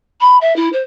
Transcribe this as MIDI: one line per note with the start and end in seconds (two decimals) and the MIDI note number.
0.20 0.37 83
0.41 0.55 76
0.56 0.69 64
0.73 0.83 72